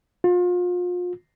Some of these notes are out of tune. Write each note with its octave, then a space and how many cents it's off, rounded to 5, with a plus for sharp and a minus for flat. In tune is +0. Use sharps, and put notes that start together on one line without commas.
F4 +35